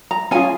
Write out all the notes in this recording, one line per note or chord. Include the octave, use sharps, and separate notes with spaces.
A#5
C#4 F4 G#4 G#5